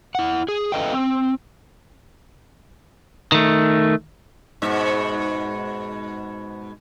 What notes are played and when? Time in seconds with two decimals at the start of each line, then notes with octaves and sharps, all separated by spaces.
0.15 E4 F#5
0.48 G#4
0.72 A4 B4 D#5 F5 G5
0.92 C4
3.32 D#3 A3
4.62 G#2 B2 E5